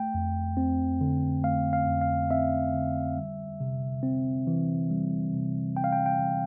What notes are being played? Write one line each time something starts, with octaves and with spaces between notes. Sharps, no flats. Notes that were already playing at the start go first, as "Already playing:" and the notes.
Already playing: A3 G5
F2
C4
D3
A3 F5
F5
F2
F5
C4 E5
D3
G3
C3
C4
E3
G3
C3
C4 G5
F5
G5
G5
E3